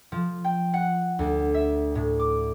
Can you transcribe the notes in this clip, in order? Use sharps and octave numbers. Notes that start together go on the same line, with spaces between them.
F3
G5
F#5
D2
E5
A2
D6